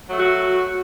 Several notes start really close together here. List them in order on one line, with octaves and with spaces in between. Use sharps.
F#3 A3 F#4